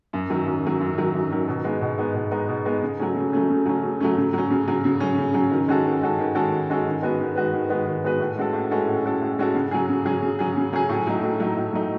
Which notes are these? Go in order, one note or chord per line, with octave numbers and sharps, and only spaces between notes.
F#2
D#3 F#3
F#2
D#3 F#3
F#2
D#3 F#3
F#2
D#3 F#3
B2
G#3 B3 D#4
B2
G#3 B3 D#4
B2
G#3 B3 D#4
B2
G#3 B3 D#4
C#3
F#3 A3 C#4
C#3
F#3 A3 C#4
C#3
F#3 A3 C#4
C#3
F#3 A3 C#4
C#3
F#3 C#4
C#3
F#3 C#4
C#3
F#3 C#4
C#3
F#3 C#4
D#3
G#3 C#4 F#4 A4
D#3
G#3 C#4 F#4 A4
D#3
G#3 C#4 F#4 A4
D#3
G#3 C#4 F#4 A4
D#3
G#3 B3 F#4 B4
D#3
G#3 B3 F#4 B4
D#3
G#3 B3 F#4 B4
D#3
G#3 B3 F#4 B4
A2
G#3 C#4 F#4 A4
A2
G#3 C#4 F#4 A4
A2
G#3 C#4 F#4 A4
A2
G#3 C#4 F#4 A4
C#3
F#3 C#4 G#4
C#3
F#3 C#4 G#4
C#3
F#3 C#4 G#4
C#3
F#3 C#4 G#4
A2
F#3 A3 D#4
A2
F#3 A3 D#4
A2
F#3 A3 D#4